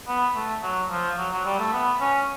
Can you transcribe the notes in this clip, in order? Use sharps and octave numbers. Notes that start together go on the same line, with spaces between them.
B3
A3
F#3
F3
F#3
F#3
G3
A3
B3
C#4